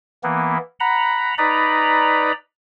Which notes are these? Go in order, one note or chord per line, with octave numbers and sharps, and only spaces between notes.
E3 A#3 B3
F#5 A#5 B5
D#4 B4 D5 A#5 B5